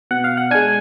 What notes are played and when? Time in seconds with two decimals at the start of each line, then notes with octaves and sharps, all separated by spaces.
0.11 B2 F#5
0.24 F5
0.37 F#5
0.51 G#3 D4 G#5